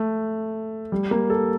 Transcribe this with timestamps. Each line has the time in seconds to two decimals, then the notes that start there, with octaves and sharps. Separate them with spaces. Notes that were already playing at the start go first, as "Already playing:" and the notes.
Already playing: A3
0.92 G3
1.11 A#3
1.30 A4